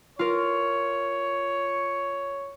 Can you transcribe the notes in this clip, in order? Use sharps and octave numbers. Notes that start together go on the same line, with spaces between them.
F4 A#4 C#5